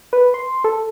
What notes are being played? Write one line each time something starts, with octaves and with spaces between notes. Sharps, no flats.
B4
C6
A4